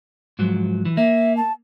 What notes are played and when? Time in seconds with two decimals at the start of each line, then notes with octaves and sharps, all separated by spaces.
0.39 G#2 F3 F#3
0.85 E3
0.97 A#3 E5
1.37 A5